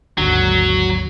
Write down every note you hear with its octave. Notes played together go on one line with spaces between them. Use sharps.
G#1 D#2 D3 F#3